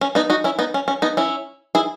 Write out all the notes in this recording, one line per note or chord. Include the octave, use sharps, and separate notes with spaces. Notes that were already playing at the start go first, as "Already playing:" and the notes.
C#4
B3 D#4
D#4 F#4
C#4 E4
B3 D#4
C#4
C#4
B3 D#4
C#4 E4
E4 G#4